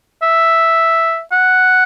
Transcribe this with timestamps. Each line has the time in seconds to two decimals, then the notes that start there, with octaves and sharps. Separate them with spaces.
0.22 E5
1.32 F#5